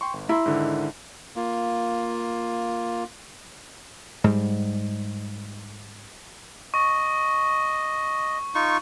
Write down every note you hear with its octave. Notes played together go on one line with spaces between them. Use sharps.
G5 C6 C#6
G1
E4 A#5 C6
G#2 D3 D#3
A#3 F4
G#2 G3
D#5 C#6
D#4 F4 C#6